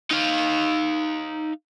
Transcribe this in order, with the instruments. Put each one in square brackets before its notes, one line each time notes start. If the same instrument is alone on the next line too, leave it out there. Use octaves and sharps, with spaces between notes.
[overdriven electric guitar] D#4 F5